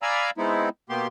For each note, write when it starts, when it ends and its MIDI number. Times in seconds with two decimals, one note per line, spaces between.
0.02 0.31 74
0.02 0.31 77
0.02 0.31 80
0.02 0.31 82
0.02 0.31 83
0.02 0.31 88
0.38 0.69 56
0.38 0.69 59
0.38 0.69 60
0.38 0.69 63
0.38 0.69 64
0.89 1.07 47
0.89 1.07 58
0.89 1.07 59
0.89 1.07 67
0.89 1.07 84